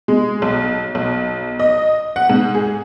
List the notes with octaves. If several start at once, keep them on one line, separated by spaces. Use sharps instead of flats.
G#3
B1
B1
D#5
F#5
G#2
G#4